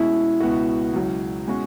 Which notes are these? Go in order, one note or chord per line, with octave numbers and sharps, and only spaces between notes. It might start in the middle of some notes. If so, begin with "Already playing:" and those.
Already playing: B2 G#3 C#4 E4
C#2 B2 B3 F#4
C#2 B2 F#3
B2 G#3 C#4 F#4